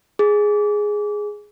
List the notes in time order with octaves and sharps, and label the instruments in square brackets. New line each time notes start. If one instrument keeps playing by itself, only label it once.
[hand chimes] G#4